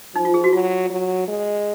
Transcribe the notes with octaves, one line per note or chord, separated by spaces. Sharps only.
F3 D#4
F4
G#4
F#4
F#3 F4
F#3
G#3